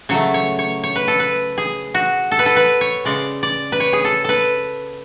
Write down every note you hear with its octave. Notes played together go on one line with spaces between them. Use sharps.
C#3 F#3 A3 C#5
C#5
C#5
C#5
B4
A4
B4
G#4
F#4
A4
B4
A4
B4
C#5
C#3 G#3 D5
D5
B4
C#5
G#4
A4
A4 B4